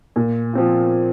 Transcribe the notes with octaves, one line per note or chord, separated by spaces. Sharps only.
A#2
F3 C4 F4